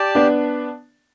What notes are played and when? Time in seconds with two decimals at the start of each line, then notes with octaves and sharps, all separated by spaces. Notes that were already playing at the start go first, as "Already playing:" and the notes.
Already playing: G4 D5 A5
0.15 B3 D4